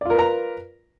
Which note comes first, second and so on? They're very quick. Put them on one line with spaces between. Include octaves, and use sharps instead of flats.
D5 F4 A#4 B4 A#5